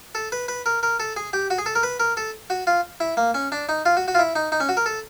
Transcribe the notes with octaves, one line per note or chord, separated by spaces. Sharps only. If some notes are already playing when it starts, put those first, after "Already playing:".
A4
B4
B4
A#4
A#4
A4
G#4
G4
F#4
G#4
A4
A#4
B4
A#4
A4
F#4
F4
E4
A#3
C#4
D4
D#4
F4
F#4
F#4
F4
E4
D#4
D#4
C#4
F#4
A#4
A4